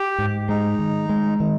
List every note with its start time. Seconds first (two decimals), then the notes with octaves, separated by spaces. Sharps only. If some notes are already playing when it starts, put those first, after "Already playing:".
Already playing: G4
0.18 G#2
0.49 G#3 D#4
0.79 D#3
1.09 G#3
1.40 D#3